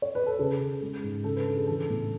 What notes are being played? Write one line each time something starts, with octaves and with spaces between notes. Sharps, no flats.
C#5
B4
A4
C#3 G#4
C#3
G#3
G#2
C#3 A4
B4
D4 A4
G#4
E3 A4
A2